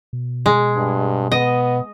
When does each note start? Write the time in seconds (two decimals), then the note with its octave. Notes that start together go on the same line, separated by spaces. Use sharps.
0.13 B2
0.46 G#3
0.76 G2
1.32 B3 D#5